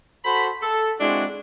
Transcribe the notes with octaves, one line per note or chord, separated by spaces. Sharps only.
F#4 A4 C5 B5
A4
G#3 C4 D4 E4 F#4